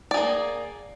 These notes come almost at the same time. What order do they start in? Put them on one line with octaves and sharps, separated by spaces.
D5 G#4 A#3